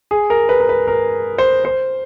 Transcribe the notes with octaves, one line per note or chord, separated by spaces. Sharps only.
G#4
A#4
B4
A#4
B4
A#4
C5
C5